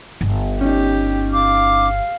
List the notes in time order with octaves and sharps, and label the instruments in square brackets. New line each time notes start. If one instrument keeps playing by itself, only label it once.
[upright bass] G1
[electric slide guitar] C#4 D#4 [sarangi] G4
[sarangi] F5 [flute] D6